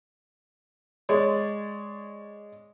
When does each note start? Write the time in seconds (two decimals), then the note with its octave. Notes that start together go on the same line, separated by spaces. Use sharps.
1.09 G#3 C#5 D5